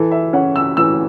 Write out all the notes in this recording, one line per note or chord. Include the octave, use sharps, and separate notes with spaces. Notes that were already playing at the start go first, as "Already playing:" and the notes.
Already playing: E3 A4
E5
C#4 E4 F#5
E6
E3 E6